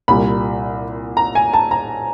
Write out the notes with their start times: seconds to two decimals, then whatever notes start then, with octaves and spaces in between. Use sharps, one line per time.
0.08 C2 A#2 G3 B5
1.17 A#5
1.35 G#5
1.53 A5
1.71 A#5